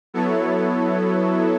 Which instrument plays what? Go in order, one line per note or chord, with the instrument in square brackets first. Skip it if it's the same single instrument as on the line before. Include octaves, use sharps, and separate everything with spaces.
[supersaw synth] F#3 B3 E4 A4 C#5